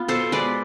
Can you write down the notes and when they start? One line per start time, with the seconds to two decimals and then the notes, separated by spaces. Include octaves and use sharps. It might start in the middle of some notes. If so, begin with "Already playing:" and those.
Already playing: B3 F4
0.08 B2 A4 C5
0.32 G#3 B4 D5